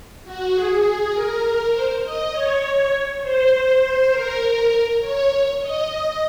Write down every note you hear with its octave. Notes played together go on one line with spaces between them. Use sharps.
F#4
G#4
A#4
C5
D#5
C#5
C5
C5
A#4
A#4
C#5
C#5
D#5